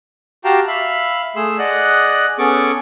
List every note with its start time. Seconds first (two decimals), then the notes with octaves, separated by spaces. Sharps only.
0.45 F#4 G4 F5 G5 A5 A#5
0.68 E5 F5 B5
1.36 A3 G#4 C6 E6
1.59 G#4 D5 D#5 F#5 F#6
2.39 B3 C#4 G#4 A4 C#6 D6